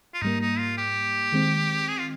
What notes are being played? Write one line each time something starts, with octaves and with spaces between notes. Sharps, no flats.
F4
G#2 G3 A#3 D#4
D#4
F4
G4
D#3 G#3 C4
G#4
F4